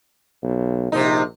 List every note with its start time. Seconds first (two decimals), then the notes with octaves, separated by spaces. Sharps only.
0.43 B1
0.92 A#1 C3 D#4